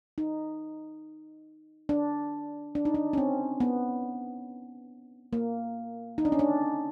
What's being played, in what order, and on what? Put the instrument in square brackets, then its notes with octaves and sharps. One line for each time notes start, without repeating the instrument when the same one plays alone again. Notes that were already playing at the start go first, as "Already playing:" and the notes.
[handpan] D#4
D4
D4
D#4
D4
C#4
C4
B3
A#3
D#4
D4
C#4
D4